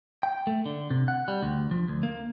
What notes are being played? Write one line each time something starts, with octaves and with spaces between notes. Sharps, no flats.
G5
A3
D3
C3
F#5
G3
D2
F3
D2
A#3